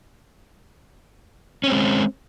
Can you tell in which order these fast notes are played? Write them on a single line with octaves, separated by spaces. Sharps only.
C#4 C4 G#3